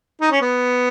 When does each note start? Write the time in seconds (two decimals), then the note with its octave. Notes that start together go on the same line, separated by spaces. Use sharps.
0.21 D#4
0.31 C#4
0.42 B3